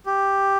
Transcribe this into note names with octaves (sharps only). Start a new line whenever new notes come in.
G4